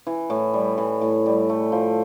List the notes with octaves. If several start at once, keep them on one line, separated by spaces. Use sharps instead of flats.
E3
A2
G3
E3
A2
G3
A3
F3